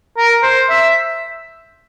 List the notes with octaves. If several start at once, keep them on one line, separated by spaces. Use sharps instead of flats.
A#4
C5
E5